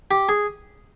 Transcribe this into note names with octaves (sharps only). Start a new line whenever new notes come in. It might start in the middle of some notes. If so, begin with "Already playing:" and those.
G4
G#4